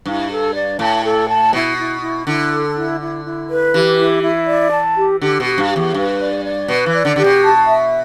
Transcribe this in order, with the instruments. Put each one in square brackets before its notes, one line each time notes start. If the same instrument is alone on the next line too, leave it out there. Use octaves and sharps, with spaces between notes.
[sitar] G2 [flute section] E4
[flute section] A4
D5
[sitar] A2 [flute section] A5
[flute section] A4
A5
[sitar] B2 [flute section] E4
[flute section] E4
E4
[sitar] D3 [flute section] E4
[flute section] A4
E4
E4
E4
B4
[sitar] E3 [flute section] G4
[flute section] E4
E4
D5
A5
G4
[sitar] D3 [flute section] G4
[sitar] B2
[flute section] G4
[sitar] G2
[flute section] G4
[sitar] E2
[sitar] G2 [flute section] B4
[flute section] D5
D5
[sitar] B2 [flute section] B4
[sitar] E3
[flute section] D5
[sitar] D3
[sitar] D3 [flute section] G4
[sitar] B2
[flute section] A5
E5